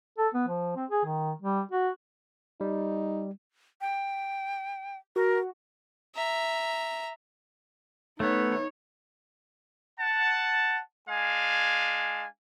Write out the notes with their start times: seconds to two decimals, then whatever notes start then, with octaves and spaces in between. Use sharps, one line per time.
0.18 A4
0.34 B3
0.48 F3
0.76 C4
0.90 G#4
1.05 D#3
1.42 G3
1.71 F#4
2.61 G3 D#4
3.81 G5
5.16 F#4 A#4
6.15 E5 A#5
8.20 A3 B3 D#4 C#5
10.00 F#5 A5
11.09 G#3 D4 F5 G#5